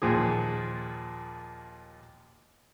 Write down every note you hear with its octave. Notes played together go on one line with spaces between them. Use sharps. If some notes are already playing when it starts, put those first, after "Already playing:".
D#2 A#2 F3 G#4